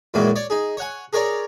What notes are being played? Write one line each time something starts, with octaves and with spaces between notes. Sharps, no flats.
F#2 A#2 D#3 E3 F#3 G#3
C#5 D5
D#4 G#4
C#5 F#5 G#5
G#4 A#4 C#5 D5 A#5